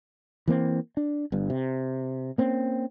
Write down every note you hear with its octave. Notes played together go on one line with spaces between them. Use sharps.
E3 A#3 C4
D4
G1 G2
C3
A#3 C4 C#4